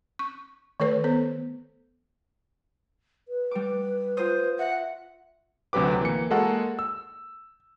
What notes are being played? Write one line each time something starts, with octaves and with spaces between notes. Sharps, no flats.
C#6
D#3 A3 A4 B4 C#5
B3 A4 C5
B4
G3 D6
F4 C5 D#6
E5 F#5
D2 C3 F#3 G4 B4 D6
E3 A#3 C#7
G#3 A#3 F#4 A4 F#5
E6